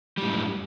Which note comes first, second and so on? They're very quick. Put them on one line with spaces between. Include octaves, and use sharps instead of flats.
G3 A2 F#2